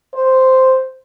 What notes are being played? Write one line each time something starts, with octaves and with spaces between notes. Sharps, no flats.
C5